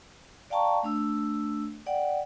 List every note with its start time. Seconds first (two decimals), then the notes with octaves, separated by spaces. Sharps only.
0.50 D5 F5 G5 A5 A#5 C#6
0.83 A3 D4 E6
1.86 D5 F#5 G5